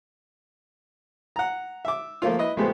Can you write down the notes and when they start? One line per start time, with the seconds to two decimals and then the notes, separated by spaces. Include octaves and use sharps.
1.36 F#5 A#5
1.85 E5 D6
2.22 F3 A3 A#3 F4
2.38 E4 B4 D#5
2.57 A#1 G#3 A3 B3 G4 C5